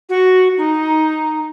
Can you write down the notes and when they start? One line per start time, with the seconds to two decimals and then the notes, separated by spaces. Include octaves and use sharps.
0.09 F#4
0.57 D#4